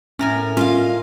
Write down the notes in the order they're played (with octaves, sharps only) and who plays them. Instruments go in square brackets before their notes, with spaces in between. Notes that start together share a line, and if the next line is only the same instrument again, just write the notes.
[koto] A2 A#4 G#5 [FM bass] C#4
[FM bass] C#4 [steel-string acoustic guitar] F4 D#5 F5